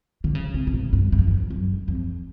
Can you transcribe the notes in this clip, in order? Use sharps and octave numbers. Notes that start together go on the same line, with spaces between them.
D3
C#3
C3
C3
B2
G2
G2
F#2
G2
F#2
F2